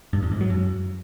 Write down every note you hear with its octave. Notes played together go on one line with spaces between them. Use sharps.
G2
E2
G#2
F#3
F#2